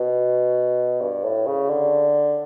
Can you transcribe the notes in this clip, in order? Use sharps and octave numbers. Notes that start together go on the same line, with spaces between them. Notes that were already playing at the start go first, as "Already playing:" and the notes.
Already playing: B2
G2
A2
C#3
D3